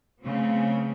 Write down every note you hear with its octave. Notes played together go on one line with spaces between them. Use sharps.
C#3 F#3 A3 B3 C4